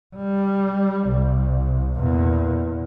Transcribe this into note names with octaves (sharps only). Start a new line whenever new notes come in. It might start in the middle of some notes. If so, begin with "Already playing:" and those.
G3
C2
E2 A#2